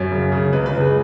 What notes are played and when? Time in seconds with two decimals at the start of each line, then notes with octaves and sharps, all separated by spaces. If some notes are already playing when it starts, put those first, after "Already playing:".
Already playing: F#2 C#5
0.11 C#3
0.32 C#3
0.53 C#2 B4
0.66 B4
0.73 C#2
0.80 G#4